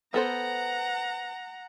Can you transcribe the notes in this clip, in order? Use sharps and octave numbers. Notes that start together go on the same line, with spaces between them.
B3 A4 C5 F#5 A#5